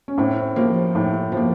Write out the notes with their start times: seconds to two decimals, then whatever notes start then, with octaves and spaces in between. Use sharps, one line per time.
0.08 C#4
0.18 A2 C4
0.56 F3 A#3
0.95 A2
1.32 F3
1.37 A#3